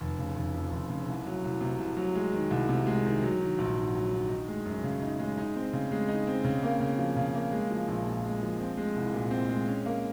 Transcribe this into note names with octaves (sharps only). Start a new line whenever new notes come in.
F1
C#3
F1
F2
F1
C#3
C2
F#3
C2
C3
C2
F#3
G#3
D#3
C2
C3
G#3
D#3
F#3
D#3
A#1
G#2
F#3
D#3
D#4
G#3
F#2
C#3
D#4
G#3
D#4
C4
C#3
G#3
D#4
C4
C#3
A#3
C#3
F3
C#3
A#3
G#3
F3
A#1
A#2
G#3
F3
C4
G#3
C2
A#2
C4
G#3
C#4
A#3